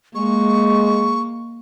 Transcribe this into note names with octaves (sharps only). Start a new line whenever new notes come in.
G#3 A#3 C#6